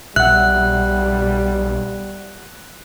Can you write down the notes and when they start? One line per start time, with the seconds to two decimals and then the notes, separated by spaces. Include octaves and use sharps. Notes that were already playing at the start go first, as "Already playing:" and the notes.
0.16 B1 G3 E5 F#5 F#6